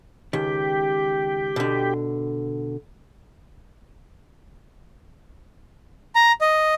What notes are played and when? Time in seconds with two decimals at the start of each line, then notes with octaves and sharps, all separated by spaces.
0.33 C#2 D#3 G4
1.56 B2 D3
6.15 A#5
6.41 D#5